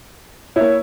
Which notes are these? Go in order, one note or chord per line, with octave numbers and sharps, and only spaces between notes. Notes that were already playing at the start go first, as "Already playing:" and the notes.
A#3 E4 C#5